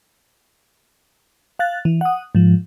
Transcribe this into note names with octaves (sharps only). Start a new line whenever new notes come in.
F5 F#6 A6
E3
F#5 D#6
G#2 F3